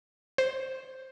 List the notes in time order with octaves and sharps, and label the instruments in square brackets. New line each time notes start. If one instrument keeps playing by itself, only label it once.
[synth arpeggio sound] C5